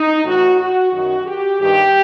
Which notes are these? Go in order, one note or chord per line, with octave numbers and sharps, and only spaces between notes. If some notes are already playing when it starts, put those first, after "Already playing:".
Already playing: D#4
A2 E3 F#4
F#4
F#2 D#3 F#4
G4
G2 D#3 G4